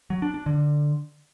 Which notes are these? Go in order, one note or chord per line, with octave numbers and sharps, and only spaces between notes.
F#3
D4
D4
D3